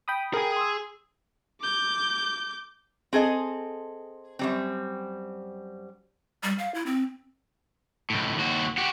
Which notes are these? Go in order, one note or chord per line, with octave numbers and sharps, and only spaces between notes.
G5 B5 D#6
G#4 A#4 G#5
C6 D#6 E6
D6 G6
C4 G#4 A4 D#5
F#2 G3 C4
G3
F5
E4
C4
C#2 A2
D#2 F#4
F#4 G4